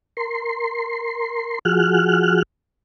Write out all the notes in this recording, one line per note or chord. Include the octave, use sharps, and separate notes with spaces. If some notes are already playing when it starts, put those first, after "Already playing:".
A#4 C6
F3 F#4 G#4 F6 F#6